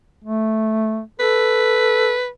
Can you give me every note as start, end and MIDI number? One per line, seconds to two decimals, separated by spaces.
0.24 1.01 57
1.20 2.14 69
1.20 2.28 71